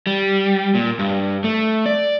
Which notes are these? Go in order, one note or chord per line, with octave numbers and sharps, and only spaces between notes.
G3
A#2
G2
A3
D5